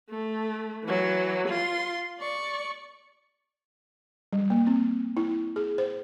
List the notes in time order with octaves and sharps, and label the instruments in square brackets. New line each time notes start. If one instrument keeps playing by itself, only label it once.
[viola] A3
E3 F#3
F4 C6
D5 C#6
[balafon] G3
A#3
C4
E4
G#4
C5